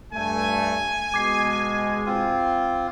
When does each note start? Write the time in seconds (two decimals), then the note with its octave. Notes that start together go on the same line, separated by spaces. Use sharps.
0.13 G2 A3 G#5
1.14 B2 G#3 D6 G#6 C7
2.06 C4 F4